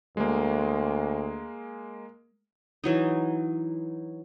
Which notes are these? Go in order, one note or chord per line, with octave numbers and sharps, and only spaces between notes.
D2 G#3 A#3
E3 F#3 D#4